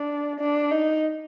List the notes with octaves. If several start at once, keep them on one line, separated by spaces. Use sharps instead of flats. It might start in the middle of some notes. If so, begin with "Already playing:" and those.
Already playing: D4
D4
D#4